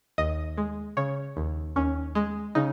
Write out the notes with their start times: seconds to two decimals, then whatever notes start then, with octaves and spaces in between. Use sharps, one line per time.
0.18 D#2 D#5
0.58 G#3
0.97 C#3 C#5
1.37 D#2
1.76 D#2 C#4
2.15 G#3
2.55 C#3 D#4